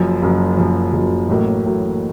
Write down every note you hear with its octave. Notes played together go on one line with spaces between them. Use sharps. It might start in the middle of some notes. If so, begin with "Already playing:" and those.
Already playing: F#1 F#2 F3
F#1 F#2 F3
F#1 F#2 F3
F#1 F#2 F3
A1 A2 F#3 A#3
A2 F#3